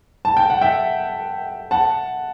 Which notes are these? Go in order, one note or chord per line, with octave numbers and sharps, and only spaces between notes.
A5
G5
F#5
E5 G5
F#5 A5